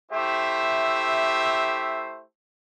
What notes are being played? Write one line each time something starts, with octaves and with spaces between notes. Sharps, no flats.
A3 E4 G4 C5 E5